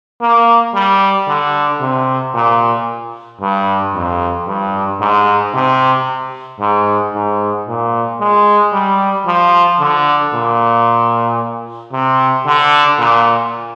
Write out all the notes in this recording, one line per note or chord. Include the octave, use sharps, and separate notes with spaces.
A#3
G3
D3
C3
A#2
G2
F2
G2
G#2
C3
G#2
G#2
A#2
G#3
G3
F3
D3
A#2
C3
D3
A#2